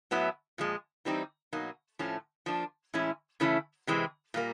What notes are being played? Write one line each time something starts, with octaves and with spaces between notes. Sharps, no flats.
A2 F#3 B3 E4
A#2 F3 G#3
E3 G3 C4 D#4
B2 F#3 A#3 D#4
A2 F3 A3 C#4
F3 A#3 D4
A2 E3 G#3 C#4 E4
C#3 E3 A3 C#4 E4
C3 E3 G#3 C4
A#2 G3 A#3